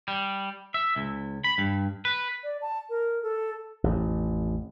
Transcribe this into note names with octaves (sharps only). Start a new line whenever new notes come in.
G3
E5
C#2
B5
G2
B4
D5
A5
A#4
A4
A1 F2